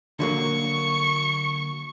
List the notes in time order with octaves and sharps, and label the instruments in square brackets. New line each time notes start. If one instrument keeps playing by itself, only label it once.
[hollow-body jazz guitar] D3 F#3 A#3 [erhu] C#6